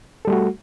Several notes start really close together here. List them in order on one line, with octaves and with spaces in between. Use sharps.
A4 G3 A3 F#4